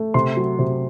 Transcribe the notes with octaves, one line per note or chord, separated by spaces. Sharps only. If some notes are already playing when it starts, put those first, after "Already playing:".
Already playing: A3
C3 C6
F#3
C3